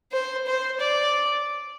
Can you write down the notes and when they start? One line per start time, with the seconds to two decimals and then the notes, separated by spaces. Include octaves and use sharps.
0.12 C5
0.47 C5
0.80 D5